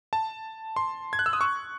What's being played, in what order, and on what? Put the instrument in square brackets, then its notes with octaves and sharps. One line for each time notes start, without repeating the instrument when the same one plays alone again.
[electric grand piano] A5
C6
G#6
F#6
E6
D#6
C#6